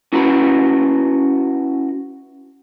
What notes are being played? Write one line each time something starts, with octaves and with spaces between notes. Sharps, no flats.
C#4 E4 F#4 B4 A#5 B5